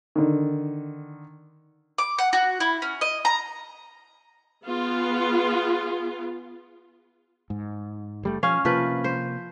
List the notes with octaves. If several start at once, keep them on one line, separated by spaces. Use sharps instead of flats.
D3 D#3
D6
F#5
F#4
E4
C#4
D#5
A#5
B3 F4 G#4
G#2
F#1 G3 A3
F3 C#4 F5
C3 F3 A#3 B4
C5